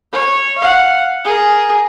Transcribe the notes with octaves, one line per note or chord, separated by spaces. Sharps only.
C#5
F5 F#5
G#4 A#4